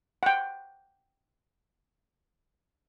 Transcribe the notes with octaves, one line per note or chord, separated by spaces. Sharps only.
F#5 G5